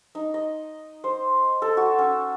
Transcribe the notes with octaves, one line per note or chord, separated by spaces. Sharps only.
D#4
D#5
C5
A4
F#4
C#4